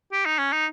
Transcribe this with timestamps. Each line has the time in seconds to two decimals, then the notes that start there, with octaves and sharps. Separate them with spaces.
0.12 G4
0.26 D#4
0.39 C#4
0.53 D#4